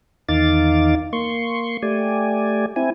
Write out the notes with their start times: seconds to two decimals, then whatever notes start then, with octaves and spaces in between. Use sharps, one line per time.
0.29 E2 D#3 D#4 F5 D6 A6
1.13 A#3 C6 C#6
1.82 A3 G4 D5 G#5
2.76 C4 E4 G#5